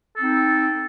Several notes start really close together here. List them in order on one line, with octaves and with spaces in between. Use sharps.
A4 C4 D#4